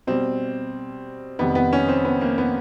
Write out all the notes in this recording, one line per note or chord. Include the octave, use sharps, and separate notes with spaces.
B2 G3 C4
F2 C3 D#3 G3 B3
B3
C#4
C4
B3
A#3
B3